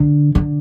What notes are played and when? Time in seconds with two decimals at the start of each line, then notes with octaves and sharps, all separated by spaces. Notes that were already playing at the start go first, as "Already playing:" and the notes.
Already playing: D3
0.35 D3